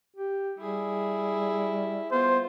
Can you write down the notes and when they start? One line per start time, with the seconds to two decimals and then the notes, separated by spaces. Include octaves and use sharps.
0.16 G4
0.59 G3 E4 G#4
2.11 B3 F4 C5